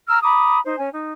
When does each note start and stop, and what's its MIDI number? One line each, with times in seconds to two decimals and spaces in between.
0.08 0.20 82
0.08 0.20 88
0.08 0.20 89
0.23 0.58 82
0.23 0.58 83
0.23 0.58 86
0.23 0.58 87
0.64 0.75 63
0.64 0.75 72
0.78 0.89 61
0.78 0.89 80
0.94 1.12 63